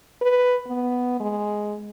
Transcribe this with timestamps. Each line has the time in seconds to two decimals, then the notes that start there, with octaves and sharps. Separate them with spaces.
0.22 B4
0.67 B3
1.20 G#3